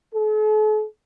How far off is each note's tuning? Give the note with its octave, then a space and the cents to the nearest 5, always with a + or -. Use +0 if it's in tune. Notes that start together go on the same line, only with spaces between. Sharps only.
A4 -45